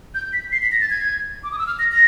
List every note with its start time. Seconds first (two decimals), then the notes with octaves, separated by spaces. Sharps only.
0.15 G6
0.33 B6
0.52 C7
0.62 B6
0.72 A#6
0.81 A6
0.90 G#6
1.44 D6
1.52 D#6
1.59 E6
1.67 F6
1.79 A#6
1.92 A#6